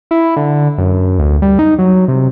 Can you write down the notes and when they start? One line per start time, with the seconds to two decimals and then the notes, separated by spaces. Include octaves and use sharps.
0.11 E4
0.36 D3
0.78 F#2
1.19 D2
1.42 G3
1.59 D#4
1.79 F#3
2.08 C3